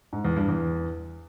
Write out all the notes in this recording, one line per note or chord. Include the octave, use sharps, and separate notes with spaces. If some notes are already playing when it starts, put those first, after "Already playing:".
G#2
E2
G2
E2